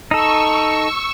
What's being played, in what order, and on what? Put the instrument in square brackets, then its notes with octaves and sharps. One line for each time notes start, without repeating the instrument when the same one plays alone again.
[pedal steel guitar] D#4 A4 [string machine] C#6 E6